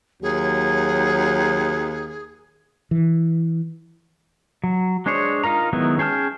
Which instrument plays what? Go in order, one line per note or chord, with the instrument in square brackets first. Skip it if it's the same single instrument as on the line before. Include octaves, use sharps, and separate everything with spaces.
[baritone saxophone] D#2 [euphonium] F#3 [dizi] G#4
[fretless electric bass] E3
[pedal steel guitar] F#3
G#3 D4 G#4 C5 C#5
D#4 F4 A#4 A#5
D#3 F#3 G#3 B3 E4
C#4 G#4 G5 A5 F6